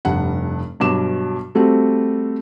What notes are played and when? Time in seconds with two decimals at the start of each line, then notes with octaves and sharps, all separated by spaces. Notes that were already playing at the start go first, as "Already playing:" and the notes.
0.05 F1 G2 F#5
0.80 G2 B2 F#3 D6 E7
1.55 G3 A3 C4 F#4